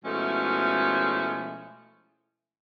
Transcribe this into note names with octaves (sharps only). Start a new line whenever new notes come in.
B2 F3 G#3 A3 C#4 E4